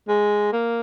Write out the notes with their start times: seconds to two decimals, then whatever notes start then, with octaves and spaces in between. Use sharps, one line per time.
0.08 G#3
0.53 A#3